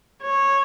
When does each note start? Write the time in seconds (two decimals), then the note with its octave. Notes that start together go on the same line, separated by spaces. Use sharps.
0.23 C#5